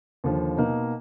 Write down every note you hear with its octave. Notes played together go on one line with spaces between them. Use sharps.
D#2 D3 F3
B2 A#3 D#4